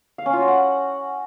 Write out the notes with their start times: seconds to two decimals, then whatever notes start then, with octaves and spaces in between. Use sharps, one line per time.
0.18 F5
0.26 C#4
0.33 F4
0.41 F#4
0.48 F#5